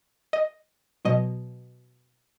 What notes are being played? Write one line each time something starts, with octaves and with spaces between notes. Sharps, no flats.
D#5
B2 F#3 D#5